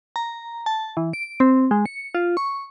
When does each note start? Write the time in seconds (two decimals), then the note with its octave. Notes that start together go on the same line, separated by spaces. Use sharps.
0.16 A#5
0.66 A5
0.97 E3
1.13 D7
1.40 C4
1.71 G#3
1.86 C#7
2.15 F4
2.37 C#6